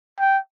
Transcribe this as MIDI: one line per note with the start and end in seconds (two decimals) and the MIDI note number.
0.19 0.38 79